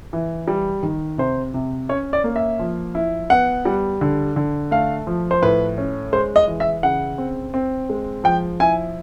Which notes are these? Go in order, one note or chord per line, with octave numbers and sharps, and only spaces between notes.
E3
G3
D#3
C3 C5
C3
C#4 C#5
D5
A#3
E5
F3
E4
B3 F#5
G3
D3
D3
A3 F5
F3
C5
A2 B4
C#4
G#3 C5
D#5
E3
E5
C#3 F#5
C4
C4
G#3
F3 G5
E4 G#5